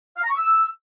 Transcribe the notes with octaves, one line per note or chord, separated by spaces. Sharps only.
F5
A#5
C#6
E6